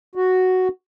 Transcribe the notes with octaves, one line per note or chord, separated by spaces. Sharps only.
F#4